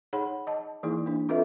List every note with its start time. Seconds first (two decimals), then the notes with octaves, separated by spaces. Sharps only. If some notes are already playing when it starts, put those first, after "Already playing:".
0.13 D#4 G#4 C#5 F#5 B5
0.47 D#5 A5
0.83 E3 A#3 D#4 E4 G#4
1.06 A#3 D4
1.29 C4 F4 A4 B4 D#5 E5